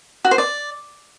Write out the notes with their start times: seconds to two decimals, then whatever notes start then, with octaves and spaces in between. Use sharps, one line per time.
0.25 F#4
0.31 C5
0.38 D5